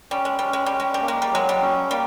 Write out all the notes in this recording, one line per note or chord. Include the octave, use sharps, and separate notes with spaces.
G3 C#4
G#3
G3 C#4
G#3
G3
C#4
G#3
G3
A#3
G#3
G3
F#3 G#3
G3
C#4
G3 A#3